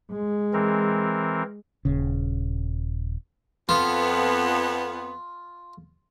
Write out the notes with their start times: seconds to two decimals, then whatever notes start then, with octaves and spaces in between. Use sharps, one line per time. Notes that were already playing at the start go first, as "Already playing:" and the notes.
0.12 G#3
0.53 E3 C4 A#4
1.85 D#1 C#3
3.69 F2 B3 F4